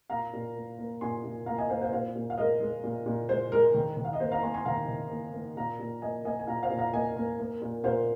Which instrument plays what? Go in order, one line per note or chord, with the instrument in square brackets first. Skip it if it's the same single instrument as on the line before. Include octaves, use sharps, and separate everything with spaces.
[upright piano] A#2 F5 A#5
A#2
A#3
A#3
A#2 G#5 C6
A#2
A#3 F5 A#5
D#5 G#5
A#3 C5 F5
C5 F5
A#2 C5 F5
A#2
F5
G#3 A#4 D#5
G#3
A#2
A#2
G#3 C5
G#3 A#4
D#3
D#3
F5
D#5
A#3 C5
F5 A#5
A#3 G#5 C6
G#5 C6
D#3 F5 A#5
D#3
A#3
A#3
A#2 F5 A#5
A#2
A#3 D#5 G#5
A#3 D#5 G#5
G#5
A#2 F5 A#5
C5 F5
A#2
F5 A#5
A#3 D#5 G#5
A#3
A#3
A#2
A#2 C5 F5